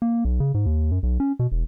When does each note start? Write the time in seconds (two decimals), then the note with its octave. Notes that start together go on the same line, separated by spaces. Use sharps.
0.02 A#3
0.25 B1
0.40 C#3
0.54 G#2
0.66 D#2
0.92 F#2
1.03 B1
1.20 C#4
1.39 B2
1.52 E1